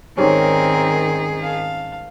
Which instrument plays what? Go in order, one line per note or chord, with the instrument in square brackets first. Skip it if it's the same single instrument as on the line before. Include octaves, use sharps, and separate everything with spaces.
[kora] G#2 G3 C#4 [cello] D#3 G#4 [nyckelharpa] C4 A#4
[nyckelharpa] F5 A5